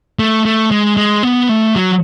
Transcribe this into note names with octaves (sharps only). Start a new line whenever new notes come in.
A3
A3
G#3
G#3
B3
A3
F#3